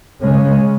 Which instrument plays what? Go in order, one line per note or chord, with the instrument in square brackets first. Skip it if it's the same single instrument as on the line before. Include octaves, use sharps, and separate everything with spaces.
[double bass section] C#3 G#3 C#4